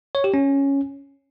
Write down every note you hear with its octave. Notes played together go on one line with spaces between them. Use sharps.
C#5
G4
C#4